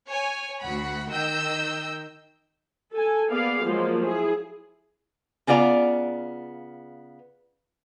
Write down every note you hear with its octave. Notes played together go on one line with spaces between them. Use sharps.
C#5 G#5
D2 F#4 F#5 B5
D#3 D#5 G5 E6 G6
A4 G#5
A#3 B3 G#4 D5 F5
F3 F#3 G#3 A#3
E4 G#4
C#3 B3 F4 D5 A#5